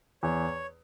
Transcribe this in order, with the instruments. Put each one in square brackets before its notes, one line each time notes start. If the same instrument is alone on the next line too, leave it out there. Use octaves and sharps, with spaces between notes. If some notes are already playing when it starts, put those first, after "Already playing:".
[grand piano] E2 [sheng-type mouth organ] C#5